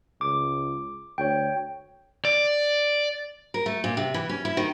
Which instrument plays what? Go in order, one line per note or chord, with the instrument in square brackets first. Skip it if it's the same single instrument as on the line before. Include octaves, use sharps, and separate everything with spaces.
[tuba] C#2 [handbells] D6
[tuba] D2 [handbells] C#5 G5
[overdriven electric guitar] D5
[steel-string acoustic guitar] A#4
A3
A#2
C3
E3
C#4
E4
D#3